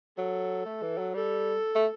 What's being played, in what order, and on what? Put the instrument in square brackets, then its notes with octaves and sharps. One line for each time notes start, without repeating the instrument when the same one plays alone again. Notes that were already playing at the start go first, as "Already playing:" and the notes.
[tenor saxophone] F#3 [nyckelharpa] A4
[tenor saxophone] A3
E3
F#3
[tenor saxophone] G3 [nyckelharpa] A4
[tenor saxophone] A3